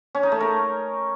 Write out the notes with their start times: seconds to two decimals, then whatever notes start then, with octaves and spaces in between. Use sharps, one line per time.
0.15 C#4
0.23 D#4
0.32 A3
0.40 A#4